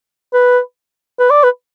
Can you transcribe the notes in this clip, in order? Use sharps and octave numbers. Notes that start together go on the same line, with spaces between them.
B4
B4
D5
B4